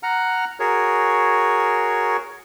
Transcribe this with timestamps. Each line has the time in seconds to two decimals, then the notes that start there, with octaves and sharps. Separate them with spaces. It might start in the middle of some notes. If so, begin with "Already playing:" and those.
0.03 F#5 A#5 F6
0.60 F#4 G#4 A#4 C#5